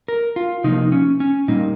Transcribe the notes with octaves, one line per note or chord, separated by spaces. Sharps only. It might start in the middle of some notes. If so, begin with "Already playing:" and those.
A#4
F4
C3 F3 A#3 D#4
C#4
C#4
A#2 G3 A#3 D#4